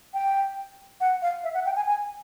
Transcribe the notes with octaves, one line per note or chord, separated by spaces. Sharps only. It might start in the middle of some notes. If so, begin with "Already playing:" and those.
G5
F#5
F5
E5
F#5
G5
G#5
G#5